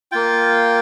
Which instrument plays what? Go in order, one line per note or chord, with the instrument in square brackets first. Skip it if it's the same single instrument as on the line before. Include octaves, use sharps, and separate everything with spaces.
[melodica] A#3 F4 G5